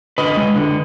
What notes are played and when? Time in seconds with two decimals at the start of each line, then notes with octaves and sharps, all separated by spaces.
0.18 D3 B4 D#5
0.37 G#3
0.56 D3